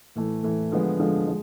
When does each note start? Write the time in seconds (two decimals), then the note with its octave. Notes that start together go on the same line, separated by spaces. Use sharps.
0.15 A2 E3 A3
0.43 A2 E3 A3
0.72 D3 F3 G#3 B3
0.99 D3 F3 G#3 B3
1.27 G#3